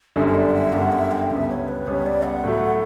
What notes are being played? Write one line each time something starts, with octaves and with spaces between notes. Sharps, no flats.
G1 F#2 D3 G3 E5
E5
D5
F#5
E5
G1 F#2 D3 G3 F#5
E5
G5
C#2 C#3 G3 B3 E5
C#5
B4
C#2 C#3 G3 B3 C#5
D5
F#5
A2 F#3 A3